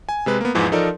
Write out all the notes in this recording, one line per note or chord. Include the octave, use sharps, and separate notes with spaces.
G#5
C3 G#3 B4
A#3 B3
E2 G#2 E3 F3
F3 D#4 A4 A#4 D5